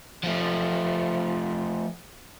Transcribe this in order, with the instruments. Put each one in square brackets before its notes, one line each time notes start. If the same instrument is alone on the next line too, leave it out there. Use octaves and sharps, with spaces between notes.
[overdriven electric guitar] F3 A3